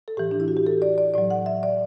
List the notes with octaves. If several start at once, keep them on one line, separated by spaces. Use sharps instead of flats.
A4
A2 E3 G4
D4
E4
F#4
G4
A4
D5
D5
A2 F#3 D5
F#5
E5
D5